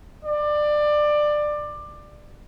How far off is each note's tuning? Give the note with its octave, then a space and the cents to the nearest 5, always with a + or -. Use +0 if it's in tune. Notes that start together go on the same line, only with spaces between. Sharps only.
D5 +20